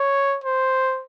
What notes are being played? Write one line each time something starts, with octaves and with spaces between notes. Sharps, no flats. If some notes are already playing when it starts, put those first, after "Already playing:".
Already playing: C#5
C5